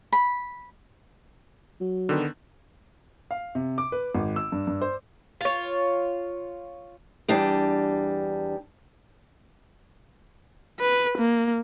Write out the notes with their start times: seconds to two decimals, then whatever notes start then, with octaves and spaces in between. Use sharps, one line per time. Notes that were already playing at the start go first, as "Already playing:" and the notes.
0.12 B5
1.80 F#3
2.09 D3 D#3 B3
3.31 F5
3.55 C3
3.78 D6
3.92 B4
4.15 G#1
4.36 E6
4.52 G2
4.67 G2
4.82 C5
5.41 F4 C#5
7.28 E2 G3 D4 A5
10.80 B4
11.18 A#3